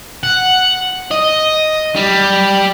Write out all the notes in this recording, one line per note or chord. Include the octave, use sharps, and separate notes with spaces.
F#5
D#5
G3